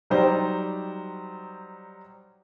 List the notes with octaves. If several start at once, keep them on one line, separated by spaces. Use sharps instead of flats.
F#3 G3 D#4 G4 C5 D5